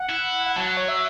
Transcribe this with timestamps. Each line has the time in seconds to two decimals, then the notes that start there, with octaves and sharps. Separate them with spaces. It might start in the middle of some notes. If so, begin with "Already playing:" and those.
Already playing: F#5
0.10 E4
0.46 F#5
0.56 F#3 A5
0.67 F#5
0.77 C#5
0.88 E5